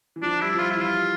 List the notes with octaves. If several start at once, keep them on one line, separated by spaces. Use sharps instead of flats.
E3
F3 D4
G3 E4
F3
G3 F4
E4
E3 F4